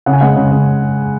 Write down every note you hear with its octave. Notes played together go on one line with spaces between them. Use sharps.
C#3 F#5
G#5
G#3 F#5
C#3
C#3